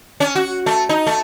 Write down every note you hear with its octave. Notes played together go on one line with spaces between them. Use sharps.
C#4
F#4
A3
D#4
A3